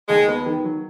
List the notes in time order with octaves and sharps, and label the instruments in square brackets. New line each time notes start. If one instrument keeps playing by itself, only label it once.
[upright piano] D#2 [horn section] G#3
[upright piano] B3
D#3
F#3